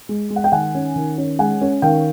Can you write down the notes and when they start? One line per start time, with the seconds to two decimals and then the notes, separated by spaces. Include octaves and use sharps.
0.09 G#3
0.30 G#3
0.36 F#5
0.44 G5
0.52 D#3 F#5 G#5
0.75 C#4
0.96 D#3
1.18 C#4
1.39 G#3 F#5 G#5
1.61 C#4
1.82 D#3 F5 G5